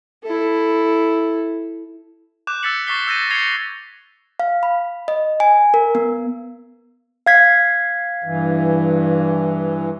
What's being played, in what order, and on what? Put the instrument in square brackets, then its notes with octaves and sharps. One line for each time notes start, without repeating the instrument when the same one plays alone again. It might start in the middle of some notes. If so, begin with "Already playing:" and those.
[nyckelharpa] E4 A4
[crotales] D6 F#6 G6 E7
E6 G6 A6 B6 C#7 F#7
C#6 D6 A6 B6 C7 G7
E6 G6 A6 A#6 D#7
G#6 A#6 C7 C#7 F7 G7
[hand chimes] F5
B5
D#5
G#5
A#4
B3
[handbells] F5 G#6 B6
[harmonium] G2 E3